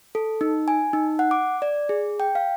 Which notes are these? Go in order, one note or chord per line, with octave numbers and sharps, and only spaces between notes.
A4
D#4
G#5
D#4
F#5
D6
D5
G#4
G5
F5